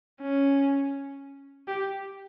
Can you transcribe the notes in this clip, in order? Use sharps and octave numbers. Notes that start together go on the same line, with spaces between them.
C#4
G4